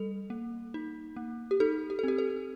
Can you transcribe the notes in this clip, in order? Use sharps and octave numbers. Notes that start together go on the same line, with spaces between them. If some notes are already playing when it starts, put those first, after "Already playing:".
Already playing: G3 A4
A#3
D#4
A#3
G4
D#4 A4
G4
A4
C4 G4
A4